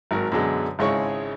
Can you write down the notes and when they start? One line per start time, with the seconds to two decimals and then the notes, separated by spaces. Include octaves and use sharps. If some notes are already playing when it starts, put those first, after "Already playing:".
0.11 G#1 F#3 A#4
0.32 F#2 B2 D3 G#3
0.79 G#1 C#3 G#3 E4 C#5 C#6